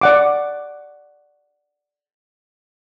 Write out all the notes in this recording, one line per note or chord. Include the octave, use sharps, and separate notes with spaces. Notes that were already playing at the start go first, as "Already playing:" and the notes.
D5 F#5 D6